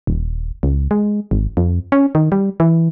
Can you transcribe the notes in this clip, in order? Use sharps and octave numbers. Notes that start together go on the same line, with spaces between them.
D#1
C#2
G#3
G#1
F2
C#4
D#3
G3
E3